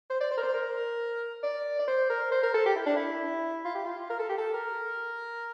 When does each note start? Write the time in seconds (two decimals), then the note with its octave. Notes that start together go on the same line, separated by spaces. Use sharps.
0.10 C5
0.20 D5
0.31 C5
0.37 A#4
0.43 C5
0.54 A#4
1.43 D5
1.79 D5
1.87 C5
2.09 A#4
2.31 C5
2.43 A#4
2.54 A4
2.66 G4
2.76 E4
2.86 D4
2.96 E4
3.65 F4
3.75 G4
3.84 F4
4.10 A#4
4.19 A4
4.29 G4
4.38 A4
4.54 A#4